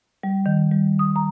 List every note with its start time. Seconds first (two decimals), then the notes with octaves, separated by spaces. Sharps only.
0.23 G3
0.46 D#3
0.72 G3
0.99 D#6
1.16 A#5